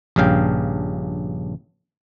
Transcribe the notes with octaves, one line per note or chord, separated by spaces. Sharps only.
A#1 G2 C#3 F5 G5